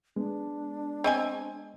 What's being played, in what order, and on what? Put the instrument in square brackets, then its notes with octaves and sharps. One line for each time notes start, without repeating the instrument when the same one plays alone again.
[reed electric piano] G#3 B3 [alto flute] D4
[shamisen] C4 D#5 G#5